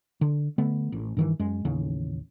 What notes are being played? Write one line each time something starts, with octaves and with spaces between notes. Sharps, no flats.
D3
D3 A3 B3
A1
G2 D#3 E3
F#2 G#3
A1 D#2 C#3